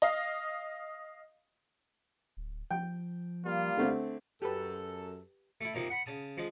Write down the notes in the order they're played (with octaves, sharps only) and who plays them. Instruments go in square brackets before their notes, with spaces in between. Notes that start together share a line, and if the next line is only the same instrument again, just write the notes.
[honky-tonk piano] D#5 F5
[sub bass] D1
[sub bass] F3 [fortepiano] G5
[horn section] G3 A#3 F4
[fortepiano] D3 A3 C4
[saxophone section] F#2 A4 [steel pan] G4 B4
[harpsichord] A3 E4
C3 F3 A#3 D#4
F#5 B5
C#3 A5 D#6
F3 G#3